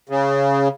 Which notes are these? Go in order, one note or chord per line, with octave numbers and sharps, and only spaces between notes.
C#3